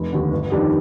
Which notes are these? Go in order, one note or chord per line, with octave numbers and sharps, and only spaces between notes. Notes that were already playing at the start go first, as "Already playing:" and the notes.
Already playing: F1
D#2 D3
G1
F2 D#3 G3 D4